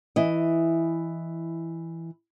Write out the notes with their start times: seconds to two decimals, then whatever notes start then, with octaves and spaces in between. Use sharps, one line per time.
0.16 E3 E4 D#5